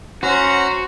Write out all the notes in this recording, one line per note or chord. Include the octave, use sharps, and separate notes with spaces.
C#4 F#4 C5 F#5 A#5